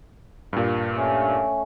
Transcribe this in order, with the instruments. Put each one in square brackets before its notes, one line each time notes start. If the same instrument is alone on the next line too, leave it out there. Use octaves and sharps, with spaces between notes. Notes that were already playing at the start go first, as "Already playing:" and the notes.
[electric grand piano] G2 A#2
[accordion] A3 C#4